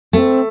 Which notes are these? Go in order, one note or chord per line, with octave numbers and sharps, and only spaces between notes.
A3 C4